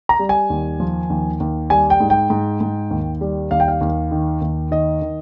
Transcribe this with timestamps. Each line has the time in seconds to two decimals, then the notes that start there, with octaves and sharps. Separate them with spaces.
0.09 A#5
0.19 G3
0.29 G#5
0.50 D#2
0.80 F3
1.10 D#2
1.40 D#2
1.70 G3 G#5
1.90 G5
2.00 G#2
2.10 G5
2.30 G#2
2.61 G#2
2.91 D#2
3.21 G3
3.51 D#2 F5
3.60 G5
3.68 F5
3.81 D#2
4.11 D#3
4.41 D#2
4.71 D#3 D#5
5.02 D#3